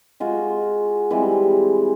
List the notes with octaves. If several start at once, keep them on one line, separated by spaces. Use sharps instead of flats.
G#3 F4 F#4
E3 G3 G#3 C4